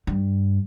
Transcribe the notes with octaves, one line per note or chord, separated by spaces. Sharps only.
G2